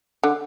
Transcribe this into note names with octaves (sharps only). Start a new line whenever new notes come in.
D3